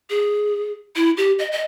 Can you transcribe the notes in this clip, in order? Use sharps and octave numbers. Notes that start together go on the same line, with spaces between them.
G#4
E4
G4
D#5
D#5